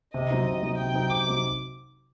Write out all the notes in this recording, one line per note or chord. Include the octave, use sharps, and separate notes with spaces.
C3 D#5
F#3 C4 D#4
C3
F#3 C4 D#4
C3 G5
F#3 C4 D#4
C3 D6
F#3 C4 D#4